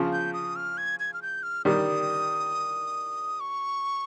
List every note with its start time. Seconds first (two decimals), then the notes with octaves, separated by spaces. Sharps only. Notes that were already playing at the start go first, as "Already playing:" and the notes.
Already playing: C#3 F3
0.13 G6
0.34 D#6
0.56 F6
0.78 G#6
1.00 G#6
1.14 F6
1.22 G6
1.43 F6
1.65 D#3 G3 D#6
3.40 C#6